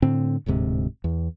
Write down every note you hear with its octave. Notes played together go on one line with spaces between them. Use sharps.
A2 D3 C4
D1 D2 G#2 C3
E2